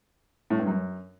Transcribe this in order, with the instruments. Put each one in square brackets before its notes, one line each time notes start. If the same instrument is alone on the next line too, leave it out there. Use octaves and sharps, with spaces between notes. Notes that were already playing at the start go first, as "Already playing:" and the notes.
[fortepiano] A2
G2
F#2